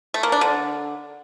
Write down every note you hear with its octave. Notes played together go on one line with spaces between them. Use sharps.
A3
A#3
D4
D3